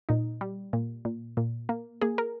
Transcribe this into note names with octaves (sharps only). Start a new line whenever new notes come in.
A#2 D#4
G3
A#2
A#2
A#2
A#3
A#3 G#4
A#4